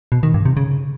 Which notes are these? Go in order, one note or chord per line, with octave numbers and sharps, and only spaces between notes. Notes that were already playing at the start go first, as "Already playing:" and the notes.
B2
D#3
G2
C3
C#3